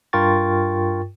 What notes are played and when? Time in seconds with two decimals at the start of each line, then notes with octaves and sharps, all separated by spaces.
0.13 G2 F4 A#4 G5 C#6 A6